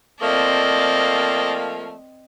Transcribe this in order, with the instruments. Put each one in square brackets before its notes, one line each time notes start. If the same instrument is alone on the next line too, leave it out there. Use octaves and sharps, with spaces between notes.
[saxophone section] F3 A3 A#3 [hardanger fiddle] C4 D5 [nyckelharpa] D#5